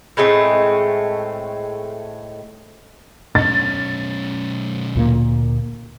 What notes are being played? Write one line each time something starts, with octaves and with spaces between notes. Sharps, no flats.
A2 G#3 A3 C4
B1 C#4 A6
D2 A#2 A#3